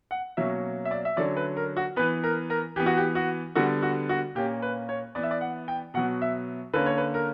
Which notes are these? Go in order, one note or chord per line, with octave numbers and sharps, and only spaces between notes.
F#5
B2 F#3 A#3 C#4 E5
E5
D5
E5
D3 F#3 C#4 D5
B4
A#4
F#4
E3 B3 B4
A#4
A#4
E3 B3 G4
F#4
G4
F#4
D3 G3 B3 F#4
F#4
F#4
A#2 A#3 C#4 G4
B4
C#5
E3 B3 D5
E5
D5
F#5
G5
B2 F#3 B3 F#5
E5
D3 A#3 C#4 B4
C#5
B4
A#4